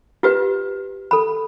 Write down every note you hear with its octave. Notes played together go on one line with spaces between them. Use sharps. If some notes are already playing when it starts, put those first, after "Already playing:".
F4 G4 B4
A4 B5